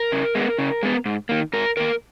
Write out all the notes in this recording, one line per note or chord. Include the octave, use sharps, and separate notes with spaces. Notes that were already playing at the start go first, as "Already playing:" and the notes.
Already playing: A#4
C#3
G#3 B3
C#3
G#3 B3
G#2
D#3 A#3
G#2 A#4
D#3 A#3 A#4